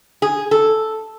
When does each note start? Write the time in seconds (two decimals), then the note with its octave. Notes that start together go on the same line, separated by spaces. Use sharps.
0.22 G#4
0.51 A4